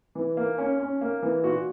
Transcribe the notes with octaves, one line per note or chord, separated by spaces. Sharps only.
E3
A#3
C#4
C#4
A#3
E3
A#2 F#4